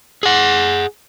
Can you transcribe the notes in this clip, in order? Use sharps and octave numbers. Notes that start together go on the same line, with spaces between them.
G#4 F#5